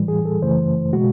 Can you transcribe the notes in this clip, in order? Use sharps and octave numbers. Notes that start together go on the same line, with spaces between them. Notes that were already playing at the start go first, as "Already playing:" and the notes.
Already playing: A2 E3 G3
G#4
A4
F#2 C#3 E3 A3 C5
B2 G#3 F#4